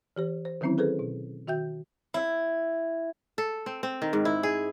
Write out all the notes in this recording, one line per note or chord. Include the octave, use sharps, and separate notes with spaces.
E3 G4 C5
C5
D3 D#3 F#3 C4 C#4 E4
G#4 A4 B4 C5
B2
D#3 F#4 E5 G5 G6
E4
A4
C4
C4
D#3
G#2
E4
G#4